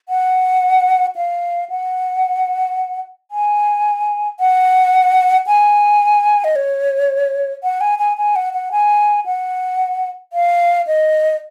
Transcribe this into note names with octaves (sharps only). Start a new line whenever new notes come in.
F#5
F5
F#5
G#5
F#5
G#5
D#5
C#5
F#5
G#5
G#5
G#5
F#5
F#5
G#5
F#5
F5
D#5